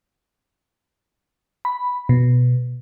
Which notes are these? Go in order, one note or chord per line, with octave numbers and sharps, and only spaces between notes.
B5
B2